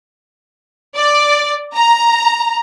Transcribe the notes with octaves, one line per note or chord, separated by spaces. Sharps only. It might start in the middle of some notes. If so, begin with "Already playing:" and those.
D5
A#5